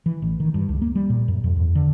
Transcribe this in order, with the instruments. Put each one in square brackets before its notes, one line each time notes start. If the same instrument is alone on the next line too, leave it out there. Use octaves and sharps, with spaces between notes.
[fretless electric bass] E3
A1
D#3
G2
C#2
A#3
G3
A#2
F#2
F2
E2
D3